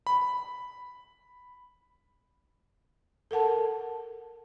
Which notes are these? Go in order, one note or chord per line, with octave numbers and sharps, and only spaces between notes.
B5
A4 A#4 F#5 A5